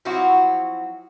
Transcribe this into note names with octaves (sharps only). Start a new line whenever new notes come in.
F3 F#3 C4 E4 F#4